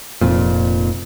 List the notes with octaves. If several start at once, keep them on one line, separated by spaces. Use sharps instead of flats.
F1 F2 A#2